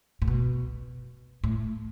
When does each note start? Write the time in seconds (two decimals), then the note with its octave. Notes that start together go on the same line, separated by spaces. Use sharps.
0.22 A2
0.28 B2
1.44 A2